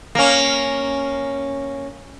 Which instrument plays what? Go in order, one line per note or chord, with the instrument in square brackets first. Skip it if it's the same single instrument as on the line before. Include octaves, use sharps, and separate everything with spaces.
[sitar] A#3 C#4